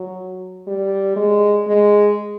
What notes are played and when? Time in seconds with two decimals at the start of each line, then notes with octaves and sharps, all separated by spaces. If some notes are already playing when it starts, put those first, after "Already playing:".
Already playing: F#3
0.67 G3
1.16 G#3
1.67 G#3